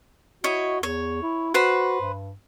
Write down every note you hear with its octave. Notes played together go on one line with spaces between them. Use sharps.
E4 F#4 C#5 D#5
E2 C#5
E4
F#4 B4 C5 B5
G2